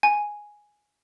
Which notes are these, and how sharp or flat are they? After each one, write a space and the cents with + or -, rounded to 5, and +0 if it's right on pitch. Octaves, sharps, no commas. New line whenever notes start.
G#5 +0